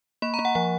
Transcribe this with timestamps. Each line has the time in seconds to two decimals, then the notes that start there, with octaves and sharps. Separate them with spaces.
0.22 A#3 B5
0.34 A#5
0.39 A#3
0.45 F#5
0.55 F3 F#5